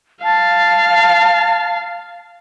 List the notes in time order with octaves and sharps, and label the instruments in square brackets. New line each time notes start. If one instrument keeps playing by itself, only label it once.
[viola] F5 [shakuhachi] A5